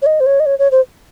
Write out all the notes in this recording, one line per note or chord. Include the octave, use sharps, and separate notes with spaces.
C#5
D#5
C5
C#5
D#5
C#5
C#5
C5